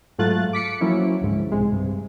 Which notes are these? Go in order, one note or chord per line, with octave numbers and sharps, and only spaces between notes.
G#2 F#3 A3 F4 F#6 A6
D6 B6 C#7 D7
F3 F#3 A#3 C#4 E4
D2 G#2
B1 C3 G#3
G2 C3